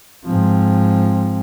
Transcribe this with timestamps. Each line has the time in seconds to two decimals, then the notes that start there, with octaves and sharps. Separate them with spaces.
0.24 G#2 F3 C4